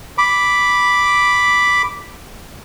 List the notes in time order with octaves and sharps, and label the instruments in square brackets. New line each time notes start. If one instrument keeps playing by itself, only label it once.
[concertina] B5 D6